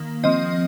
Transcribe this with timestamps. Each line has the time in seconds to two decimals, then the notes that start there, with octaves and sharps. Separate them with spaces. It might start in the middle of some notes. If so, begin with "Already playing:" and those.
Already playing: D#3 A#3
0.24 F3 C4 D#5